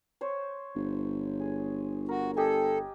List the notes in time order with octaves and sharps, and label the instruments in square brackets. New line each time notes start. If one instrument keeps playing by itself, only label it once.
[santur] C5 C#5
[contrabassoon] G1
[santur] G#4
[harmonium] F#4 [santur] A#4
[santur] G4 D#5 G#5 [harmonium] A4